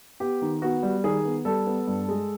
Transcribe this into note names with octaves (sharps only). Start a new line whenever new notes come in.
B3 G4
D#3
B3 F#4
G3
D#3 G#4
B3
G3 A4
B3
G2
G#3